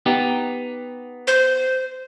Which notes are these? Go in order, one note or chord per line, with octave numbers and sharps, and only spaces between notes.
B3 D#4 G4
C5